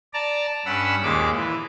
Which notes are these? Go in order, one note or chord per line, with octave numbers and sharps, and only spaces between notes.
D5 A5 A#5
G2 C#4 F#5 B5 E6
D#2 A#2 G#3 D6
E3